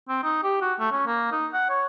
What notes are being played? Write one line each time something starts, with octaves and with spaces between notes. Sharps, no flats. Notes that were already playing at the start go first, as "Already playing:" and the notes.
C4
D#4
G4
F#4
A3
C#4
A#3
D#4
F#5
C#5